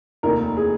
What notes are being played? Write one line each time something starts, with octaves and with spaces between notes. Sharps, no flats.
F1 D#2 D#3 A#4
G#4